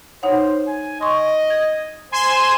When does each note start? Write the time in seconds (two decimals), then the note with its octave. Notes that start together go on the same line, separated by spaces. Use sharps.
0.23 D#4 C5 C#5 F#5
0.67 G#5
1.01 D#5 C6 C#6
1.50 G#6
2.12 C5 G#5 C6 E7